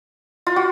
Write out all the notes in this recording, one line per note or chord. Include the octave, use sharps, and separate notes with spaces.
F4
F#4